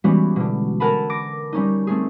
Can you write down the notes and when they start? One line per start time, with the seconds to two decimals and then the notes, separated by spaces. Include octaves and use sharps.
0.04 E3 G3 G#3 B3 C#4 F#4
0.36 B2 D3
0.80 A4 A#4 F#5 G#5 A5 B5
1.10 D6 A#6 D7
1.53 G3 C#4 D#4
1.87 A3 C4 C#4 G#4